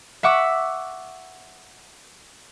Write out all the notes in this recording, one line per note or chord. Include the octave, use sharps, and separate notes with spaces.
E5 F#5 C#6 D6 E6